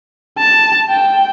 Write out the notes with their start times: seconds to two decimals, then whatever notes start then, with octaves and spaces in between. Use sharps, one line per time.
0.39 A5
0.90 G5